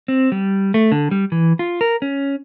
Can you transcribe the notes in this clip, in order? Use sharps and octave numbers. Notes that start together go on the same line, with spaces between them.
C4
G3
A3
D3
G3
E3
F4
A#4
C#4